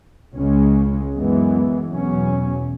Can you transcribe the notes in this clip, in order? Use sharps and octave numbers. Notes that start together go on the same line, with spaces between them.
C#2 C#3 G#3 C#4
F#2 E3 G#3 B3
E2 B2 F#3 C#4